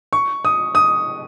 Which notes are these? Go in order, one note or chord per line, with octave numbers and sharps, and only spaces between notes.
C#6
D#6
D#6